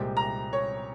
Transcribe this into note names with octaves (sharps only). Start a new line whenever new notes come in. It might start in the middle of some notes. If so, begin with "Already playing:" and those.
Already playing: C2 A#2 G#3 C4 G4
A#5
C#5